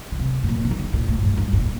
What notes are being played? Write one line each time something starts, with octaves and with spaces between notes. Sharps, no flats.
D3
C3
A2
A#2
C3
D#3
D3
A#2
A2
G2
G2
G2
A#2